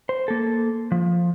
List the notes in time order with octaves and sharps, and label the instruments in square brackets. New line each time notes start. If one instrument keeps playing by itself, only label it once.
[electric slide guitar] C5
A#3 A4
F3